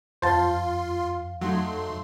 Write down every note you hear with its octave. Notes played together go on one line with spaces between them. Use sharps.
F2 F4 C5 F5 A5 C6
F#3 A3 D#4 C6